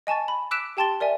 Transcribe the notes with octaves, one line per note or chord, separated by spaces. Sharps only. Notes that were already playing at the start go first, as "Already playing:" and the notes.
D#5 G#5 A5 C#6 A6
B5
D6 E6 F#6 B6 D7 E7
G4 G5 A5 C6 A6 G7
A#4 D5 E5 G#5